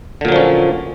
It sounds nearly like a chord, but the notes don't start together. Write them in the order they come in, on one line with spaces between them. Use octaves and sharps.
D3 A#2 F#3 F3 C#4